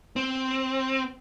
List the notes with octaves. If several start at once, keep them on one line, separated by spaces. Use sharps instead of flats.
C4